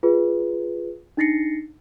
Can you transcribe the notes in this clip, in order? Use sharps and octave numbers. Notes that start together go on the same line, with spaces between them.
F4 G#4 B4
D4 D#4 A6 A#6 C7 C#7